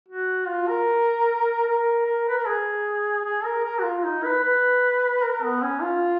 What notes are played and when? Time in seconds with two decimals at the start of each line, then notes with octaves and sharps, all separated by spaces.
0.09 F#4
0.48 F4
0.68 A#4
1.67 A#4
2.06 A#4
2.29 B4
2.37 A#4
2.46 G#4
3.24 G#4
3.44 A#4
3.65 A#4
3.79 F#4
3.84 F4
4.04 D#4
4.24 B4
4.43 B4
5.23 A#4
5.42 B3
5.62 C#4
5.82 F4